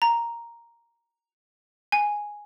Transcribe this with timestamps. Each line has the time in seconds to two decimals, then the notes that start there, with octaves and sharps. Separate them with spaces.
0.02 A#5
1.92 G#5